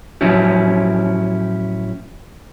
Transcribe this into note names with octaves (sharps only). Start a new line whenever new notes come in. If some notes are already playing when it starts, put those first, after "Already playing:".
A2 F3 F#3 C#4 E4 G4